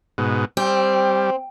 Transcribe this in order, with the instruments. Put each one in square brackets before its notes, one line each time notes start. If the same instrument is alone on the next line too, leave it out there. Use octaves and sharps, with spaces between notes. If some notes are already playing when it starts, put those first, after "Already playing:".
[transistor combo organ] G#2 B2
[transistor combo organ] G3 [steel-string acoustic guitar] C4